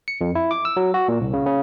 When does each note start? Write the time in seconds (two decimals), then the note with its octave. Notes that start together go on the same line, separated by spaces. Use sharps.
0.08 C#7
0.21 F2
0.35 E4
0.51 D6
0.65 E6
0.77 F#3
0.94 F#4
1.08 A#2
1.21 C2
1.33 C#3
1.47 C#3